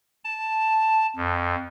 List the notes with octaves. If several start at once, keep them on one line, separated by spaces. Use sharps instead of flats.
A5
F2